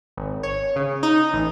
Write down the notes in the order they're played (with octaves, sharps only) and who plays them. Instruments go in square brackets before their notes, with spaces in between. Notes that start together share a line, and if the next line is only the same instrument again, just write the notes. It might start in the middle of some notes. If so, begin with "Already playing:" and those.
[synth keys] G#1
C#5
C#3
D#4
A1